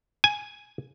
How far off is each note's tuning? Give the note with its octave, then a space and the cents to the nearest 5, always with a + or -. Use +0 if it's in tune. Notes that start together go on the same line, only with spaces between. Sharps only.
G#5 +0